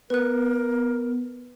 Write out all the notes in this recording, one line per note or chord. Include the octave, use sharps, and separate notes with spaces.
B3 A#4 B4 F#6